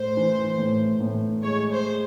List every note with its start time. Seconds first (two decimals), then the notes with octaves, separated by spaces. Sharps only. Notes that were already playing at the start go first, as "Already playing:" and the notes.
Already playing: A2 C5
0.17 E3
0.58 A2
1.00 A2
1.43 G#3 C#5
1.72 C5
1.86 G#3